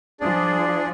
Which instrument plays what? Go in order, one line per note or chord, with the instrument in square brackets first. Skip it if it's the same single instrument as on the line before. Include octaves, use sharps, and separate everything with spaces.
[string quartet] F3 [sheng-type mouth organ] D4 [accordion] G#4 D5